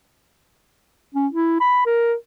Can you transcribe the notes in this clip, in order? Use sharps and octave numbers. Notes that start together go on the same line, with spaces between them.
C#4
E4
B5
A#4